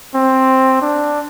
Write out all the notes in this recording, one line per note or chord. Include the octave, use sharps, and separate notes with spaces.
C4
D4